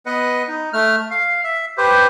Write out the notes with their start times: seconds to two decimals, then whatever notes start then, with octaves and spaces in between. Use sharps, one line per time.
0.06 B3 B4 D#5 F#5
0.48 D#4
0.73 A3 F6
1.11 F5
1.44 E5
1.78 G4 B4 C5